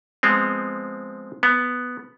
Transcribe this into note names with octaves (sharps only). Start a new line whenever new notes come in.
F3 G#3 B3 C4
B3